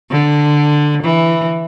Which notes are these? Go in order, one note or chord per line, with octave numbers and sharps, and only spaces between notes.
D3
E3